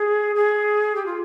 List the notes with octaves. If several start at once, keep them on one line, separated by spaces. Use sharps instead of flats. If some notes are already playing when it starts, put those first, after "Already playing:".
Already playing: G#4
G#4
G4
F4